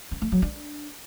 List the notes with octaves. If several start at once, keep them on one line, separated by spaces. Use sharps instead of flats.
C#4
A3
F#3
D4